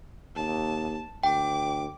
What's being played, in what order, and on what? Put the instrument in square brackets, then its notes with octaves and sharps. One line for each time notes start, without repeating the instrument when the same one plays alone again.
[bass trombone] D#2 [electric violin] A5
[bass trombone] D2 [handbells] G5 [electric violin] D6